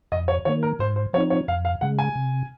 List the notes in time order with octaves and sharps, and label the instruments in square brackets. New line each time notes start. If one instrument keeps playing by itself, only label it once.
[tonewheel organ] F2 [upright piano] D#5
[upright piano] C#5
[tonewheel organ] D#3 A#3 [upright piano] C#5
[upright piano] A#4
[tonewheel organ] G#2 [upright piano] C5
[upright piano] C5
[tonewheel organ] F3 C4 D#4 [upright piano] C#5
[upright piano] C#5
[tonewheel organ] F2 [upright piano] F5
[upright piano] F5
[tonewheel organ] C#3 G#3 [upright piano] F#5
[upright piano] G#5
[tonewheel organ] C3